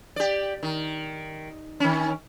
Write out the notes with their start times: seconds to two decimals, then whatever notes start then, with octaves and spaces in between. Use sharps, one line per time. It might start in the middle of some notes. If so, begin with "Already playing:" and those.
0.16 G4 D5
0.63 D#3
1.80 D#3 C#4